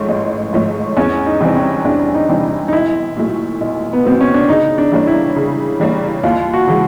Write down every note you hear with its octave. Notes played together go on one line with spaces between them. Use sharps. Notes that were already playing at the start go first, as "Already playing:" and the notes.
Already playing: G#2 F3 A3 C#4
A1
G#2 F3 A3 C#4
E2 C#4
D#4
C3 E3 G3 C4
C#4
E2 D4
D#4
C3 E3 G3 C4
D#4
B1 E4
A#2 F#3 A3
B1
B3
A#2 F#3 A3 C4
C#4
D4
C#3 D#4
D4
E3 G3 A#3 C#4
E4
C#3
E3 G3 A#3 C#4
D#2 F4
F#4
C#3 E3 G#3